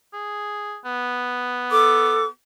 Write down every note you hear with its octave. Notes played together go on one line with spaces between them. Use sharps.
G#4
B3
A4 D6